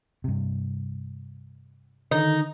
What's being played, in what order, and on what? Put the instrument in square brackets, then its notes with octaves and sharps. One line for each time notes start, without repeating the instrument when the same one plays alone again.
[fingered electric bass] G2 C3
[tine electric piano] D3 D#3 [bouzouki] D#4